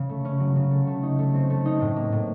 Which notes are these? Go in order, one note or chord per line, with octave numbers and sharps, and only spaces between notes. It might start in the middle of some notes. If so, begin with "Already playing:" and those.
Already playing: C#3
A3
C#4
F#3
C#3
A3
A3
D#4
A3
C4
A3
D#4
A2
A#3
A2